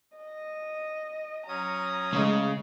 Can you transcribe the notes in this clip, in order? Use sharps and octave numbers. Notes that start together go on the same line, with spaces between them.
D#5
F#3 C#4 A#5 D#6
C#3 G#3 A3